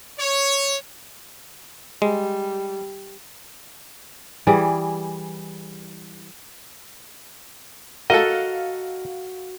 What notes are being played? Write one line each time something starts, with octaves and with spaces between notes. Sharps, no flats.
C#5
G3 G#3
E3 G3 G#4
F#4 A4 A#4 D#5 F5